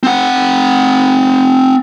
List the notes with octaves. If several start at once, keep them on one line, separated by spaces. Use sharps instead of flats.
C4 F#5